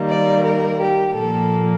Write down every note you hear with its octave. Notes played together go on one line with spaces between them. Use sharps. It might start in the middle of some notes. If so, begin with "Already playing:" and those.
Already playing: D#3 G3 A#3
D5
A#4
G4
A#2 F3 A#3 A4